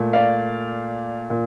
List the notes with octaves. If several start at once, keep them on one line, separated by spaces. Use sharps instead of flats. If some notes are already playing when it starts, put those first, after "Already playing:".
Already playing: A#2 A3
D5 F5
A#2